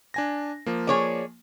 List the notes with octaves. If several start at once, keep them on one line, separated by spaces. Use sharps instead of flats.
D4 G#5 A#6
F3 A#3
G#4 C#5 D5